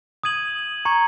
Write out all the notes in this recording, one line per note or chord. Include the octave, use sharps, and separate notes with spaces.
D#6 G#6 D#7 F#7
A#5 C#6 G#6 C#7